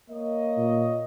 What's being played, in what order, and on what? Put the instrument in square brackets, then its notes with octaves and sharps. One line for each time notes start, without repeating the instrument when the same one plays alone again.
[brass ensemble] A#3 C#5 D#5
[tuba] A#2